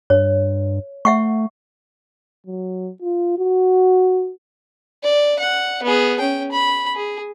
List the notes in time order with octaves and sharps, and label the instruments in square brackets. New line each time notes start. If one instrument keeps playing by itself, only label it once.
[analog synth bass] G2 [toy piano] C#5
[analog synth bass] A3 [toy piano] E5 F#5 C#6
[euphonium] F#3
F4
F#4
[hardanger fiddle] D5
F#5
B3 G#4
C#4 G5
B5
G#4